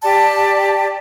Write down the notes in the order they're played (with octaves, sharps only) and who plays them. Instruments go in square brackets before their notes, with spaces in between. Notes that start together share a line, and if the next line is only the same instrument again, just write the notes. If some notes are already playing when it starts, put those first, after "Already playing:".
[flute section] G4 D5 A5